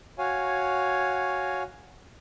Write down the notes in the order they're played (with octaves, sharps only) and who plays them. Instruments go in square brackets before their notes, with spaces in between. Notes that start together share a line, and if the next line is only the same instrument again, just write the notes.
[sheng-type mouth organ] F#4 C#5 F5 G#5